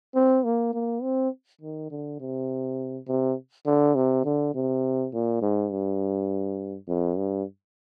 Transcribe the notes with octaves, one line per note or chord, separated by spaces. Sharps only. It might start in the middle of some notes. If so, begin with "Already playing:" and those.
C4
A#3
A#3
C4
D#3
D3
C3
C3
D3
C3
D3
C3
A#2
G#2
G2
F2
G2